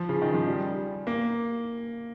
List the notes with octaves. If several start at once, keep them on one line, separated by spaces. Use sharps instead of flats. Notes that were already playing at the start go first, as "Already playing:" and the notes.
Already playing: F3
C#3
D#3
F3
G3
A#3